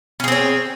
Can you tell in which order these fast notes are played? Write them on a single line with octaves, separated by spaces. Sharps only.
C#4 G#4 C4 C#5